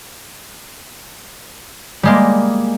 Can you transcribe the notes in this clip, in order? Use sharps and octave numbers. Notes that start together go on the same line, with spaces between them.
G3 G#3 A#3